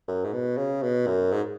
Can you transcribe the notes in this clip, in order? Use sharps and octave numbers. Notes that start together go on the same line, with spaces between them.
F#2
G#2
B2
C#3
B2
F#2
G#2